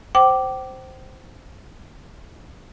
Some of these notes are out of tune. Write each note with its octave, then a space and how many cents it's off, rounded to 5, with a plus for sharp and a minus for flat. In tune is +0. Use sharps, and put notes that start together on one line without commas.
C5 +0 G5 -35 D6 +0